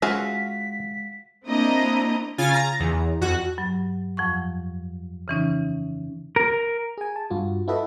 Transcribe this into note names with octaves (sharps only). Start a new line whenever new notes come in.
G#3 C#4 F4 F#4 G#4 E5 B6
A#3 C4 D4 E4 D#5 A#5
C#3 F4 G#5 A6
A#5
E2
F2 F#4 F#6
G2 F#3
F2 F3 F#5 C#6
C#3 E3 C#4 D#4
A#4
G#4 G#5
A5
G2 F4 F#4
E4 F#4 A4 B4 D#5 E5